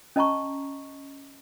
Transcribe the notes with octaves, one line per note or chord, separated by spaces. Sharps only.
C#4 D#5 A5 A#5 C#6